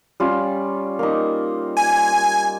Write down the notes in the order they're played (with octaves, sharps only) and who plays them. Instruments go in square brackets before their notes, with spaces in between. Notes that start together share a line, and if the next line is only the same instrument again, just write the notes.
[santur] G3 C#4 F4
A#3 D#4
[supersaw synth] G#5